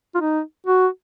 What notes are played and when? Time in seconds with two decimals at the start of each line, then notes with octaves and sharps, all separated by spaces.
0.15 F4
0.20 D#4
0.66 F#4